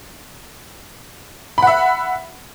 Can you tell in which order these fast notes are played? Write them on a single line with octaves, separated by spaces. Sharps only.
B5 F#5 E5